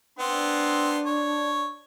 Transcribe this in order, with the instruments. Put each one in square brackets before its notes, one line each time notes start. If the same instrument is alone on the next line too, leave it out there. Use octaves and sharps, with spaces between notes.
[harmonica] B3 C4 C6 [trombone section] D4
[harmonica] C#5